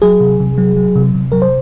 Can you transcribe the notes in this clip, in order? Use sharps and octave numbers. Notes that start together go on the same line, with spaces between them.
F#3 G#4
C3
C3
F#3
F#3
C3
C3
F#3 A#4
C5